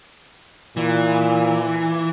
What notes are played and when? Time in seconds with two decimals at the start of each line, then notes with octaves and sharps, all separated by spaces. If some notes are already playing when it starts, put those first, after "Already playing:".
0.77 A#2 E3